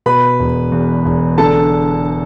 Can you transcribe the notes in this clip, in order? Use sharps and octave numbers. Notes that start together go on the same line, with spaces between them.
B2 B4 B5
E1
E2
E1
D3 A4 A5